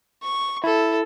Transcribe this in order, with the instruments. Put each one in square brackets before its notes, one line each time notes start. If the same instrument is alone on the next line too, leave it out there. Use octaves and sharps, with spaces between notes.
[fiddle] C#6
[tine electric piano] E4 [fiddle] A4